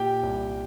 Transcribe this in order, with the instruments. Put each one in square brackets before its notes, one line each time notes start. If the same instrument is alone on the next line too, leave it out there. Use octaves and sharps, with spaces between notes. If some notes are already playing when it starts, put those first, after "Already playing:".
Already playing: [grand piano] A#2 G4 G5
C2